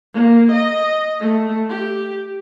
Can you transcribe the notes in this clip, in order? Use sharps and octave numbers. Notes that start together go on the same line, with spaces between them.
A#3
D#5
A3
G4